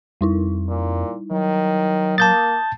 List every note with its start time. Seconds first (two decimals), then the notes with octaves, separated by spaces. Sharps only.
0.21 F2 G3 D#4 E4
0.68 A#2
1.31 D#3 F#3
2.18 A#3 A5 D#6 G6 A6